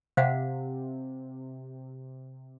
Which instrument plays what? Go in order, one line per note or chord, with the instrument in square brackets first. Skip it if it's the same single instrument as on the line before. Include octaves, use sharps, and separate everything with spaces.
[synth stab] C3 [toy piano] C5 F5 F#5